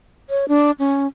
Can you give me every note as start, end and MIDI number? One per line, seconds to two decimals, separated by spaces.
0.30 0.45 73
0.48 0.71 62
0.79 1.07 61